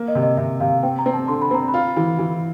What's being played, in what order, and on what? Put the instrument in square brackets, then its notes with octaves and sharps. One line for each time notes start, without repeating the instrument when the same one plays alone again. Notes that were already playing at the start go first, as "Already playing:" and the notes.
Already playing: [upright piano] A#3
[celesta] D#5
[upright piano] C3
[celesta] D#5
[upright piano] C3 [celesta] E5
[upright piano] C3 [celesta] F5
[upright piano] C4 [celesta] G5
[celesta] A#5
[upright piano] C4
[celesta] A5
[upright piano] D3 [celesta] C6
[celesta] B5
[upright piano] C4 [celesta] A#5
[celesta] B5
[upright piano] F4
E3
E3